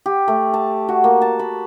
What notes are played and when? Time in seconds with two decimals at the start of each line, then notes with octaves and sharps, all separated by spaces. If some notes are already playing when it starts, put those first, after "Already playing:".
0.06 G4
0.28 A3
0.54 A5
0.89 F#4
1.04 A#3
1.22 A5
1.39 B5